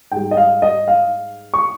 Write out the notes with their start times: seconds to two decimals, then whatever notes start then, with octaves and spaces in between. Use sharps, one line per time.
0.12 G#2 G3 G5
0.31 D#5
0.37 F5
0.62 D#5
0.88 F5
1.54 C#6